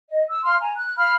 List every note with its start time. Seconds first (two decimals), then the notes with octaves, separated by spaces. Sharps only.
0.09 D#5
0.28 E6
0.43 F5 C6 F6
0.60 G#5 A#5
0.76 F#6
0.96 F5 B5 F6